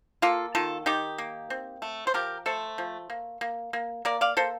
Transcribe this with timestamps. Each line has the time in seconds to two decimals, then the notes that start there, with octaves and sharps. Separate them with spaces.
0.22 A#3 F4 A4
0.55 D#3 F4 A4
0.86 D#3 D#4 G4
1.18 A#3
1.50 C4
1.82 A3
2.07 C5
2.14 F3 G4 A#4
2.46 A3 A4 C5
2.78 F3
3.10 A#3
3.41 A#3
3.73 A#3
4.05 A#3 A#4 D5
4.21 D5 F5
4.37 A#3 A4 C5